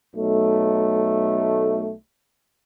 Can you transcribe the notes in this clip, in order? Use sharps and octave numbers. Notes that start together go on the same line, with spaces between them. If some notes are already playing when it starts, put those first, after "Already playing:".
B1 A3